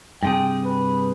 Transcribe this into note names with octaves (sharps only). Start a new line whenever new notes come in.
G2 C3 G#4 G5
B4